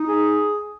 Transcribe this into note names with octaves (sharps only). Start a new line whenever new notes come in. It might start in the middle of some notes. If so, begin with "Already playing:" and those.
Already playing: D#4
G#4